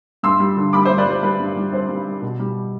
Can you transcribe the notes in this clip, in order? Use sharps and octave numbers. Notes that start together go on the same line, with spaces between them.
G2 C6 E6
G3
D3
G3 B5 D6
C5 E5
G2
B4 D5
G3 C5
G3 B4
G2
G3
C4 C5
G3
G3
B2
G3